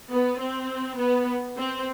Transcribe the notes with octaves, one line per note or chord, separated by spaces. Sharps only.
B3
C4
B3
C4